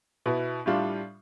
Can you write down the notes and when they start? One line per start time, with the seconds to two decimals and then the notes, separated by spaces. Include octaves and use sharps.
0.26 B2 B3 E4
0.66 A2 G3 D4 F4